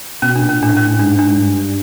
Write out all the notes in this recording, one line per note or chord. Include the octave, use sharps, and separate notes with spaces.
B2 C#4
D4
A#2
C#4
A2 D4
C#4
G#2 D4
D4
G2